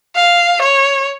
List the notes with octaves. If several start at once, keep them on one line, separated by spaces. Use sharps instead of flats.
F5
C#5